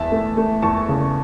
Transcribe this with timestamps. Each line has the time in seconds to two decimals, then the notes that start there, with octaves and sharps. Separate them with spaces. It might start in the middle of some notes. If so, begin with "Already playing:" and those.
Already playing: E2 E5 A5
0.12 A3
0.37 A3
0.62 E2 A5 C#6
0.89 C#3